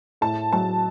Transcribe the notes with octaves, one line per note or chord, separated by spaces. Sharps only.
A2 A5
F#3 A5